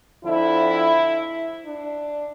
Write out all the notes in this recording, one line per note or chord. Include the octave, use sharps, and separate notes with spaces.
F2 D3 F3 E4
D4